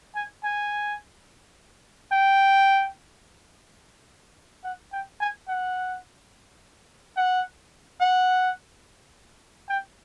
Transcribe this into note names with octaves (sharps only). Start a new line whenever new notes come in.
G#5
G#5
G5
F#5
G5
G#5
F#5
F#5
F#5
G5